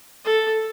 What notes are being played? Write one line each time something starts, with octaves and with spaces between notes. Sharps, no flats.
A4